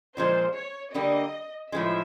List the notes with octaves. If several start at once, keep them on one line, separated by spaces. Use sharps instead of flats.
A#2 F3 G#3 C5
C#5
D3 G3 A#3 D#5
A2 F3 G#3 E5